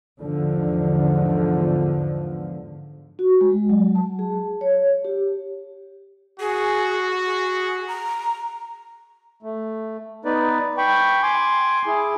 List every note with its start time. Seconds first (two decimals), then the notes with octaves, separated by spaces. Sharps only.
0.21 E2 G#2 D3 F3
3.19 F#4
3.41 G#3
3.70 F#3
3.95 A5
4.19 G#4
4.61 C#5
5.05 G4
6.40 F#4 G#4
7.25 G#4
7.88 A#5
9.43 A3
10.25 B3 D#4 B4 D5
10.78 G5 B5 C#6
11.23 G#5 C6 D6
11.87 E4 G#4